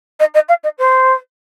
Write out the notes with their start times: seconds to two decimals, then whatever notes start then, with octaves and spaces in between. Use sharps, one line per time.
0.20 D#5
0.34 D#5
0.49 F5
0.64 D#5
0.78 C5